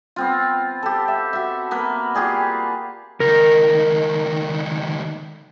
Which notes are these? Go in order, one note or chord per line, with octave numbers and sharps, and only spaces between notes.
B3 C4 F4
G4 A4
E5
F#4 E5
A#3 B3 B4
F4 G4 G#4 D5
C#2 D#3 A#4